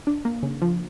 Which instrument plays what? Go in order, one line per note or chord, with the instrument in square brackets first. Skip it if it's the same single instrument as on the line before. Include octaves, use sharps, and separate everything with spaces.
[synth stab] D4
A#3
C#3
F3